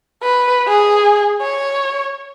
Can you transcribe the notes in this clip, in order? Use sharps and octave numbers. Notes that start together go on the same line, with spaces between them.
B4
G#4
C#5